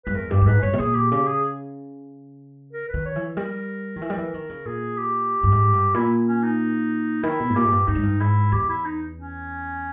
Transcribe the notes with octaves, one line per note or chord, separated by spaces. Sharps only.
G2 B4
E2 A#4
G2 G4
G2
G#2 B4
G2 C#5
B2
A#2 G#4
G4
C#3 G4
G#4
A#4
B4
D#3
C#5
E3
G3 A#4
D#3
E3
G3
E3
D#3
C#3
A#2 G#4
G4
G2
G#2
G2
A#2 E4
C#4
D#4
D#3 E4
B2
G#2
A#2 G4
G#2
G2
G2 D#4
G#2
G2
G#2 E4
E2 G4
E4
D#4
C#4